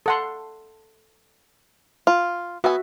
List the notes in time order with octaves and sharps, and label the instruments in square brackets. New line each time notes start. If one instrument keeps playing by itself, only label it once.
[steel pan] A4 F#5 C6
[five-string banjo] F4
[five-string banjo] B3 G#5 [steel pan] F#4 E5